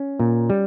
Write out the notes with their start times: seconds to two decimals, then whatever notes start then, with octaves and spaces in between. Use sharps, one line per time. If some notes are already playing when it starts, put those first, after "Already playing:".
Already playing: C#4
0.20 A#2
0.50 G3